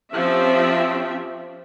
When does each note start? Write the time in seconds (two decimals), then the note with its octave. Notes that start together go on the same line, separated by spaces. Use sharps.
0.14 F3 C4 C#4 G4 E5